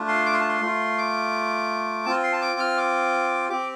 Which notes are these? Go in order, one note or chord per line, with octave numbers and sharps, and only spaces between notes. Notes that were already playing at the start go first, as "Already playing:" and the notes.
Already playing: A3 D4 F4
C6
D6
C6
A5
C6
A3 F4
D6
C4 F4 A5
C6
A5
D6
F6
D6
C4 G4 D6